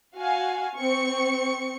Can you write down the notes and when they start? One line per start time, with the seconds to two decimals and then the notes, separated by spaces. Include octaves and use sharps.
0.16 F#4 F5 G#5
0.77 C4 C#6 C#7